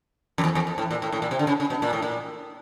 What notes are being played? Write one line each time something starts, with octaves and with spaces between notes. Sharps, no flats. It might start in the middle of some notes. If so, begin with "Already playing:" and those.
F2
E2
E2
F2
A2
A#2
A2
A2
A#2
C3
D3
C#3
C#3
B2
A#2
A2
A#2